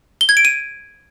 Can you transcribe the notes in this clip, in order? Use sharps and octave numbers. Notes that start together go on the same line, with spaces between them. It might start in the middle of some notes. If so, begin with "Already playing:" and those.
G7
G#6
D7
D#7